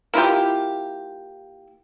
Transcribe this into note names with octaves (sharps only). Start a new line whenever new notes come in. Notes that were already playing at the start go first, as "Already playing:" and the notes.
A#3 E4 F4 G4